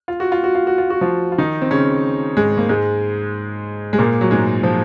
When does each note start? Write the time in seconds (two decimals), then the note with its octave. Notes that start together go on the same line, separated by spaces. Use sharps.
0.08 F4
0.20 F#4
0.32 F4
0.44 F#4
0.55 F4
0.67 F#4
0.78 F4
0.90 F#4
1.01 F3 F4
1.32 F4
1.38 D#3 D#4
1.62 C4
1.71 C#3 C#4
2.37 G#2 G#3
2.58 A#3
2.69 G#2 G#3
3.93 G#3
3.99 A#2 A#3
4.21 F#3
4.31 G#2 G#3
4.63 F3